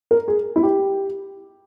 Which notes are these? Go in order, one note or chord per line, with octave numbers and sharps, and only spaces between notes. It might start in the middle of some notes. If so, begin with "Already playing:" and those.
A#4
G#4
E4
G4